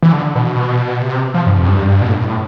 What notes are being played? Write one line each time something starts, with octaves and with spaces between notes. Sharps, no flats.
E3
D3
B2
C3
F3
G2
F2
G2
B2
A2
G2
A2